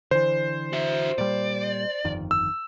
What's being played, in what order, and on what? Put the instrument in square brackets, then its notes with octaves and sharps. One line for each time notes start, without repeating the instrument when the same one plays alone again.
[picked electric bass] D3 E3 [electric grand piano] C5
[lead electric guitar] F#4 E5
[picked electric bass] A#2 G3 [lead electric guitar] D5
[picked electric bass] G1 F2 D#3
[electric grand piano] E6